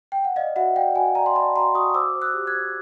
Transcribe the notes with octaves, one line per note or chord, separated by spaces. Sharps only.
G5
F#5
D5 D#5 F5
F#4 E5 F#5
D5 F5 G5
F#4 F#5 G#5
D5 G#5 A#5
C6
D5 A5 B5
F#4 A#5 C6
F#4 C#6 D#6
D#6
C5 D6 E6
C5
E6 F#6
G4
F#6 G#6
C5